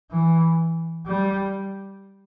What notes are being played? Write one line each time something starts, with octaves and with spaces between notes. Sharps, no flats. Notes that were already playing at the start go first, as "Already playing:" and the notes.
E3
G3